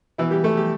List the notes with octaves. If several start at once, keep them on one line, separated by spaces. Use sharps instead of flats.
B2 E3 E4
G3 G4
G3 A3 A4
G3 G4